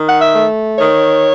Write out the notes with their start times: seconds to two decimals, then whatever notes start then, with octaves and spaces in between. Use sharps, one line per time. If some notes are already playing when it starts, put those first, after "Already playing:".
Already playing: D#3
0.09 F#5
0.21 E5
0.35 A3
0.78 D#3 C#5